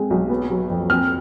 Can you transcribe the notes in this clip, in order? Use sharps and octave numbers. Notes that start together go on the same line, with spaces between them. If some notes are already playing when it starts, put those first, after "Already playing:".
Already playing: G#3 C4
B1
B3
F#3
F2
C4 F6